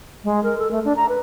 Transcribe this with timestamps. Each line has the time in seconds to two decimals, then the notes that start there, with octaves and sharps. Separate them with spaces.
0.24 G#3
0.43 A#4
0.59 A4
0.71 A3
0.85 D4
0.96 A#5
1.09 B4